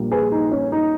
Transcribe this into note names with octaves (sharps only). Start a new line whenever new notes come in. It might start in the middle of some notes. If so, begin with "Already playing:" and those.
Already playing: A#1 A#2 G3 A#3
G#4 B4
D#4
C#4
D#4